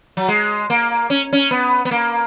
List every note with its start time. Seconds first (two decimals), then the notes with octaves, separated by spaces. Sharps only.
0.17 F#3
0.28 G#3
0.70 A#3
1.10 C#4
1.33 C#4
1.51 B3
1.85 B3
1.91 A#3